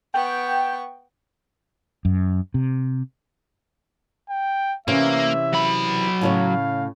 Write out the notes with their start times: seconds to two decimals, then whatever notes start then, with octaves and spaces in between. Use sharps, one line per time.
0.14 B3 G5 C#6
2.05 F#2
2.54 C3
4.30 G5
4.88 C3 E3 A#3 C#4 E5
5.53 F#3 B5
6.21 A2 C#3 C#5 F5